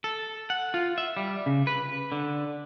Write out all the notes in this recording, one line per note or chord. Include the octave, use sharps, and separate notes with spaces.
A4
F#5
F4
E5
G3
C#3
B4
D3